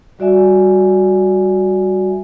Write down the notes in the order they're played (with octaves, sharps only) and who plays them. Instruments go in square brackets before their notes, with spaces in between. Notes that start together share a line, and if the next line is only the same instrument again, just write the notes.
[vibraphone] G3 F#4 D5 E5 G#5